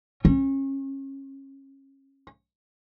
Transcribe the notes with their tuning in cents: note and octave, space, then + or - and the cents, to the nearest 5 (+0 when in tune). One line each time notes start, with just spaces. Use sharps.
C#4 -30